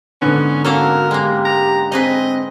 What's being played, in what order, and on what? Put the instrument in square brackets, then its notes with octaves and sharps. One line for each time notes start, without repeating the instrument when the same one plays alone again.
[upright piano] G#2 D3 B3 [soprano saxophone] C#4
[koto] A#3 C#4 A4 [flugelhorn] F#4 [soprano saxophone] A#4
[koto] G#3 A#3 [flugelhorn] G4
[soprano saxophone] A#5
[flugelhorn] C4 [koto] D#4 G#4 B4 [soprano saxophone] D#5